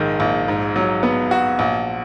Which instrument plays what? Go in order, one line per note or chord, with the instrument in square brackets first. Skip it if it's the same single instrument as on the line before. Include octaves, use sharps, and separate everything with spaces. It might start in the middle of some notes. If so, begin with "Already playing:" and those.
Already playing: [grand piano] A#1 G#2 D#3
A#1
G#2
F#3
B3
F#4
A#1